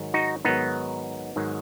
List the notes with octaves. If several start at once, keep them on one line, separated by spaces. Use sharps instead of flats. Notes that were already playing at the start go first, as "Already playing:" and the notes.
Already playing: G#2 D#3 F#3
D#4 F#4
G#2 D#3 F#3 B3 D#4
G#2 D#3 F#3